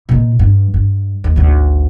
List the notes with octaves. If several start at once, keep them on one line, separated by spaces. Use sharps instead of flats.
A#2 D#4
G2
G2
D#2
G#1 D2